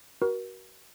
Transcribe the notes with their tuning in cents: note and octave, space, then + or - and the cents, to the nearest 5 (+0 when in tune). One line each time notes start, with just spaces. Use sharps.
F#4 +30 A#4 +30